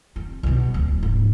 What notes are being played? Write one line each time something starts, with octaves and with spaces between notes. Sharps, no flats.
C4
C2 B2
D1
G#2